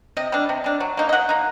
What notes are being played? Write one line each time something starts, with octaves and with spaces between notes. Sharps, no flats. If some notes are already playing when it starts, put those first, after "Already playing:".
C3 D#5
G3 D4
C3
G3 D4
F#3
A#3 D#4
D#5
F#3 F#5
A#3 D#4